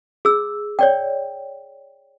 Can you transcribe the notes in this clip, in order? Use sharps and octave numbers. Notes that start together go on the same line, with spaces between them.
G#4 E6
C#5 D5 G5